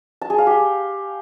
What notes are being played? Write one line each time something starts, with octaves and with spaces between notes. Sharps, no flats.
A5
G#4
F5
G4